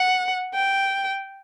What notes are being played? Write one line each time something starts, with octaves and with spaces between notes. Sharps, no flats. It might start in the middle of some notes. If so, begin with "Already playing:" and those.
Already playing: F#5
G5